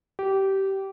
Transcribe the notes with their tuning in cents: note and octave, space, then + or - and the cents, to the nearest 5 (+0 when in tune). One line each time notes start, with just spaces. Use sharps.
G4 -20